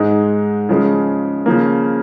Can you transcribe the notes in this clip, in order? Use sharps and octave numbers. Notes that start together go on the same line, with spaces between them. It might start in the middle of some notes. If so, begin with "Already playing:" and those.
Already playing: G#2 G#3 D#4
C#3 F3 G#3
C#3 F3 A#3